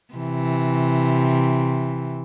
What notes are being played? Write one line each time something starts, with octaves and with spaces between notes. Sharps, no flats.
C3 E3